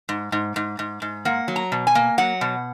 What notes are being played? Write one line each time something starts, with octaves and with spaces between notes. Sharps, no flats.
G#2
G#2
G#2
G#2
G#2
A#3 F#5
F#3
A#5
B2
G#5
A#3
F#3 F#5
B2